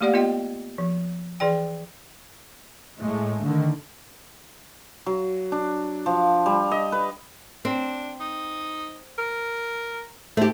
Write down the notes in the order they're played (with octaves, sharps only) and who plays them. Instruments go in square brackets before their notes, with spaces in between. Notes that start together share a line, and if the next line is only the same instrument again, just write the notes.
[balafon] A3 A#3 G4 D5 F5 F#5
B3 F4 G4 D#5 G5
F3
E3 G#4 D5 G5
[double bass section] A2 G#3 A3
D3 D#3
[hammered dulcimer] F#3
D4
F3
G3
D#5
B4
[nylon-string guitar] C4 [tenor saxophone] D4
[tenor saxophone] D#4
A#4
[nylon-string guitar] A3 G4 [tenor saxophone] C5